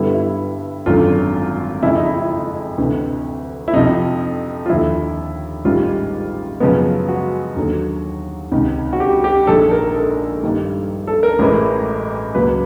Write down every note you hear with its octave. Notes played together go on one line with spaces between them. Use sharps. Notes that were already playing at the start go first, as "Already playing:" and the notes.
Already playing: G2 D3 G3 B3 E4
E4
G#1 F#2 D3 F4
F2 C#3 F3 G#3 E4
D#4
E4
E4
D#4
D2 C3 E3
E4
F2 C3 F3 D#4
F4
D#2 D3 F3 E4
A1 G#2 D#3 G3 F4
F#2 C#3 F3 G#3 B3
F#4
D#2 D3 F#3 A#3
C#2 C3 D#3
F#4
G4
G4
A#1 G#2 D#3 G#3 A4
A#4
A4
G2 D#3 G3 A#3
A4
A#4
A1 A2 E3 G#3
C#2 C#3 F#3 A#3 B4